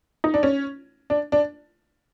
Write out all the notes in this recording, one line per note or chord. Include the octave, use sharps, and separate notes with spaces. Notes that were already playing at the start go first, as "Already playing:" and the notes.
D#4
D4
C#4
D4
D4